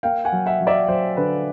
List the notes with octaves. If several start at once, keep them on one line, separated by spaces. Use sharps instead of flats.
A#3 F5 G5
F#5 G#5
F#3
E5 F#5
F#3
D5 E5
F#3 C5
D3 B4